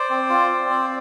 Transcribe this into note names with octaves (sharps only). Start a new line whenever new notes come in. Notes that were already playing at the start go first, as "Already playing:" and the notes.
Already playing: C5 D5
C4
F4
C4
C4